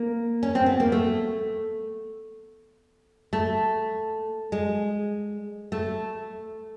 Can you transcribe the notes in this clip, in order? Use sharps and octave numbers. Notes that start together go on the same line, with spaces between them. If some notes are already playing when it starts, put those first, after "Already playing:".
Already playing: A#3
C#4
C4
B3
A#3
A3
A3
G#3
A3